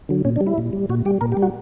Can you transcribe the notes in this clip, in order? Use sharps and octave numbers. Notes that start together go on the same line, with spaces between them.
D3 F#3
A#2 C#4
D4
G3
E4
A#2
G3
A#2 F#4
G3 G4
A#2 A#4
G4
G3
F#4